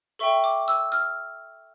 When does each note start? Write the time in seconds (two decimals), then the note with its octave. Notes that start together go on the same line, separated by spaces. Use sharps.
0.19 A4 E5 G5 C#6
0.44 D6
0.68 E6
0.92 F6